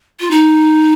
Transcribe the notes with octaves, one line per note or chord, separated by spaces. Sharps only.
F4
D#4